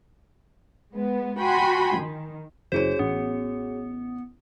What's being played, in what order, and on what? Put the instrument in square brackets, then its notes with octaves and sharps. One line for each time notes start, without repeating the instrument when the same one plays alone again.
[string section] G#3 B3
F#4 G5 G#5 B5 C6
D#3
[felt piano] F#1 E4 D#7 [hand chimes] F#4 G#4 C#5 [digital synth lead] C5
[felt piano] A1 [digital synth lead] B3